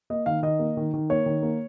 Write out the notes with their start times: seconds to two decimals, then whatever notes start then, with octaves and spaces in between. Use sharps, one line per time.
0.10 A#3 D#5
0.26 D#3 F5
0.43 D#3 D#5
0.59 A#3
0.77 D#3
0.94 D#3
1.10 A#3 C#5
1.26 D#3
1.43 A#3